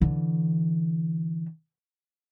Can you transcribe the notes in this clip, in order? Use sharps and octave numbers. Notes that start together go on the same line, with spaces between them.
D3 E3